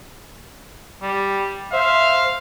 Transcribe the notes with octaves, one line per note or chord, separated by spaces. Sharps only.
G3
C5 E5 F5